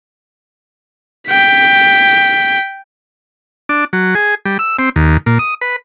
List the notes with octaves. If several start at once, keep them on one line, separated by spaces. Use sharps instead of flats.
G5 B6
D4
F#3
G#4
G3
E6
C4
D#2
A#2
D#6
B4